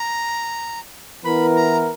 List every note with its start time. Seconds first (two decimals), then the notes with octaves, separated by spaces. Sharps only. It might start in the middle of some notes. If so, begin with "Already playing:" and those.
Already playing: A#5
1.24 E3 B3 E4 A#4 B5
1.56 A#5